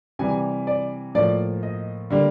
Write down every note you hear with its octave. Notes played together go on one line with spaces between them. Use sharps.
C3 E3 G3 G#5
D5
A2 F3 A#3 D5
D#5
D3 G3 A#3